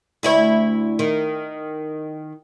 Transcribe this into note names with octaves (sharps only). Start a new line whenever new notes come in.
D2 E4 C#5
D#3